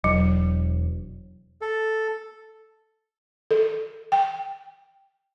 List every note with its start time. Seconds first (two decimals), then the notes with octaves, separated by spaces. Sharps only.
0.04 E1 F#3
1.61 A4
3.51 A4
4.12 G5